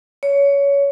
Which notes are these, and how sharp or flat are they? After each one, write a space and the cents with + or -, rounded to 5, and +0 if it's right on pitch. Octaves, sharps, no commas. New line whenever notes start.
C#5 +20